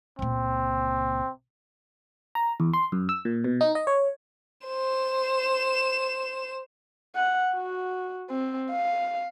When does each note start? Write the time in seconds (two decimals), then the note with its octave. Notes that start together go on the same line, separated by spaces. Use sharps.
0.19 C#2 A#2 C4
2.35 A#5
2.60 E2
2.73 C6
2.92 F#2
3.09 E6
3.25 A#2
3.44 B2
3.61 D#4
3.75 D#5
3.87 C#5
4.67 C5 E7
7.16 F#5
7.55 F#4
8.30 C4
8.71 F5